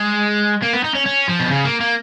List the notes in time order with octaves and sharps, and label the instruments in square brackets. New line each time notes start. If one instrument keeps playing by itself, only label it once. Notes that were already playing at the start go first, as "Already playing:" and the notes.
Already playing: [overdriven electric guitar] G#3
A#3
B3
D#4
C#4
C#4
F3
B2
C#3
A#3
A#3